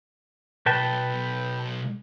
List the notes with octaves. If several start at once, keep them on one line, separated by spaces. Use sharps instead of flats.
B1 B4 G5 A5